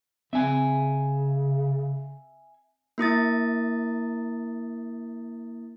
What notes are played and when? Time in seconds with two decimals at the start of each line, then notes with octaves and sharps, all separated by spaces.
0.33 C#3 C4 E5 G#5
2.98 A#3 E4 D#6 A6